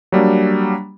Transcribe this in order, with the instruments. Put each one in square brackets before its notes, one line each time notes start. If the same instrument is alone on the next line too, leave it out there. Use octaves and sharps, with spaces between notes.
[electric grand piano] F#3 G3 A#3 D4